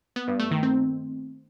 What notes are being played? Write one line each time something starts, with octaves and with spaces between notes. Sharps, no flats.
B3
G2
A3
D#3
C4